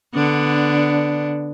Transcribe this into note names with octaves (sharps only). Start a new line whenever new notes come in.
D3 B3 D4